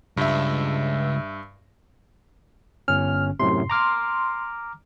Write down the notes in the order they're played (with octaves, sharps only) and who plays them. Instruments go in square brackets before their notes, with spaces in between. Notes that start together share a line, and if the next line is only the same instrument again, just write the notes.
[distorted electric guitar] C#2 [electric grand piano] G2 E5
[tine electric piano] G1 C#4 [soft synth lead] F6
[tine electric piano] F#2 A2 C3 [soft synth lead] C6
[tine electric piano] A#5 D6 F6